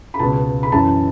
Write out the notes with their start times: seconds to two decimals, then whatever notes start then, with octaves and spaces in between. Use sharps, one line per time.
0.14 B5
0.19 C#2 B2 A5
0.63 B5
0.72 F#2 E3 A5